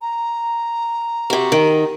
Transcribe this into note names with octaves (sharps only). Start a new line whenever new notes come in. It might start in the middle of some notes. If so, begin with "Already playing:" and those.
A#5
C3 F#4
D#3